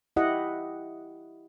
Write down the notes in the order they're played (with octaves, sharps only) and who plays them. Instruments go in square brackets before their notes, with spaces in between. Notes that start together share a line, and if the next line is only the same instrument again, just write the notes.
[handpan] E4 G4 D#5 F#5